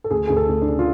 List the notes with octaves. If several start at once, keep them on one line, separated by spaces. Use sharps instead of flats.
A4
D2 G#4
D2 G#4
A4
D2
D4
C#3
F4